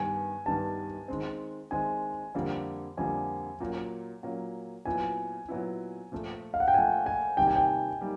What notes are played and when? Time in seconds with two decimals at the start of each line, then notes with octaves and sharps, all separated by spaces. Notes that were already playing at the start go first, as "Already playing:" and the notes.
Already playing: G2 D#3 G3 B3 G#5
0.46 G2 D#3 G3 B3 A5
1.08 D#3 G#3 C4
1.71 D#3 G#3 C4 G#5
2.35 F2 D3 G3 A#3
2.97 F2 D3 G3 A#3 G#5
3.60 A#2 F#3 A#3 C#4
4.23 A#2 F#3 A#3 C#4
4.85 A#2 F#3 B3 E4 G#5
5.48 A#2 F#3 B3 E4
6.12 A#2 F3 A3
6.54 F5
6.60 F#5
6.68 G5
6.74 A#2 F3 A3 G#5
7.06 G#5
7.37 C3 D#3 G3 A#3 D#4 G5
7.48 G#5
7.56 G5
8.01 G3 A#3 D#4